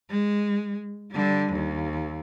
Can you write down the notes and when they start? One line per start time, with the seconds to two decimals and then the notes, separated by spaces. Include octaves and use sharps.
0.10 G#3
1.11 D3 G3
1.52 D#2